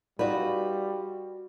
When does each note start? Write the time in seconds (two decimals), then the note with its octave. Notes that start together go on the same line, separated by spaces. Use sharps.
0.19 G3 D#4 F4 F#4 B4 D5